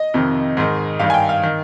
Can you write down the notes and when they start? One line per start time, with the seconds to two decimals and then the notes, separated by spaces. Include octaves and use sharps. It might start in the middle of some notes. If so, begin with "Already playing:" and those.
Already playing: D#5
0.14 F2 C3 D#3
0.57 G#2 D#3
0.99 G2 D#3 F5
1.10 G#5
1.14 G5
1.29 F5
1.43 D#3